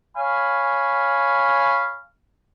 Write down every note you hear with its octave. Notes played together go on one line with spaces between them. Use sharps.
C#5 F5 G#5 B5